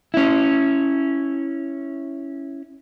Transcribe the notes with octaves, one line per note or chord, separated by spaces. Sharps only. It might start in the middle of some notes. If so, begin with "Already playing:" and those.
C#4 E4